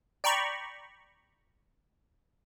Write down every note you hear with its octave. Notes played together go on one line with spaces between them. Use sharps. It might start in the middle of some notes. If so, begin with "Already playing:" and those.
D5 G5 A#5 B5 C#6